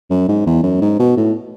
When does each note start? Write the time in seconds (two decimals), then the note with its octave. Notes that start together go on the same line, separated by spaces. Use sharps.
0.10 F#2
0.28 G#2
0.46 E2
0.63 F#2
0.81 G#2
0.99 B2
1.17 A2